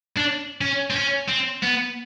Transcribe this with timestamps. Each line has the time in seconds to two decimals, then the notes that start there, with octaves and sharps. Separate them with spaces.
0.17 D4
0.61 C#4
0.90 C4
0.96 C#4
1.29 C4
1.63 B3